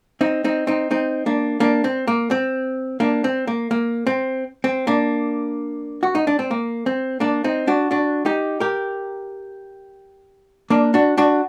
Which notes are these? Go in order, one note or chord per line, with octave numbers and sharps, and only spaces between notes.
C4 D#4
C4 D#4
C4 D#4
C4 D#4
A#3 D4
A#3 D4
C4
A#3
C4
A#3 D4
C4
A#3
A#3
C4
C4
A#3 D4
F#4
D#4
D4
C4
A#3
C4
A#3 D4
C4 D#4
D4 F#4
D4 F#4
D#4 G4
G4 A#4
A#3 D4
D4 F#4
D4 F#4